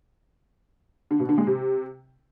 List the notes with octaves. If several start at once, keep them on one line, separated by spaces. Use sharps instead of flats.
D3
B2
D3
G#3
C3